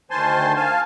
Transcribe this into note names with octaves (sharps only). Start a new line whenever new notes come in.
D2 D#3 C5 G#5 A5 C6
F5 G#5 A5